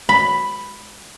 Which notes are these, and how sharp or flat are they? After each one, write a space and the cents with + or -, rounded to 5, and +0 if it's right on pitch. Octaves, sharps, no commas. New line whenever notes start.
B5 +5